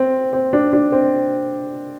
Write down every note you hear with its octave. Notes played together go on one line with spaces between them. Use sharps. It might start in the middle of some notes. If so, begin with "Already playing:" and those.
Already playing: C4
C4
D4
D4
C4